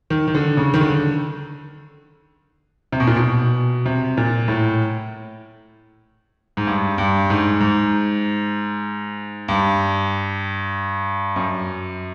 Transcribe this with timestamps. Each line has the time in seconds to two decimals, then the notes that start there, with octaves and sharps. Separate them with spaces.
0.10 D#3
0.28 D#3
0.35 D3
0.57 C#3
0.74 D#3
0.81 D3
2.92 C3
3.00 B2
3.07 A#2
3.16 B2
3.86 C3
4.17 A#2
4.48 A2
6.57 G#2
6.67 G2
6.98 G2
7.30 G#2
7.60 G#2
9.48 G2
11.36 F#2